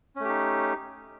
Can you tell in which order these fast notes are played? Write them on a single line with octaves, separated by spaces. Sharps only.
C#4 A3 G4 D#4